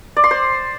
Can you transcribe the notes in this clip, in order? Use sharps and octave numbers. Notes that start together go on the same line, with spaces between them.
D5
C6
C5